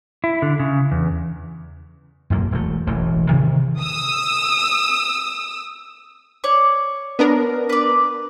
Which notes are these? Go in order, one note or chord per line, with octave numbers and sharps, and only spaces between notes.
E4
D3
C#3
E2
B1 F#2 A#3
E1 A3
E1 A1 E3 A3
C3 D#3 E3
D#6 E6
C#5 D5
B3 D4 A#4
B4 D5